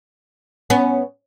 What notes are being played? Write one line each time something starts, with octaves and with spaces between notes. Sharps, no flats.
B3 C#4